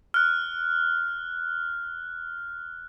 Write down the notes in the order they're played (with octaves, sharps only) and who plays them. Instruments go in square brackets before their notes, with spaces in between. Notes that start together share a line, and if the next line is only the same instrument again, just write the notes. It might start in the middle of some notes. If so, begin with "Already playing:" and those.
[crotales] F6 F#6